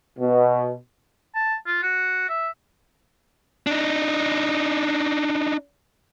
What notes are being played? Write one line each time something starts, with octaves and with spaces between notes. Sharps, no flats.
B2
A5
F4
F#4
E5
D4 D#4